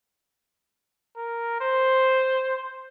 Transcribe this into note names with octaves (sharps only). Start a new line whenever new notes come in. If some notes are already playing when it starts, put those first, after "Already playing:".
A#4
C5